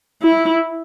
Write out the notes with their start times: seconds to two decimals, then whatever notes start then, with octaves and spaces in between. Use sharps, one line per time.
0.22 E4